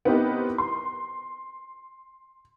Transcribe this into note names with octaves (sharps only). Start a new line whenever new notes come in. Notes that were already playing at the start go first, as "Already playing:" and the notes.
B3 C4 D#4 E4 G4 A#4
C6